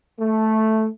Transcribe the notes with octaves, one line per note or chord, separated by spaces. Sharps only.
A3